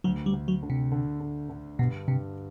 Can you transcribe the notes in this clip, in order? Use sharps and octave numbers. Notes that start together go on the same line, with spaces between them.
D2 F#3
G3
D2
F#3
D3
C3
D3
D3
D3
G2 B2
G2 C3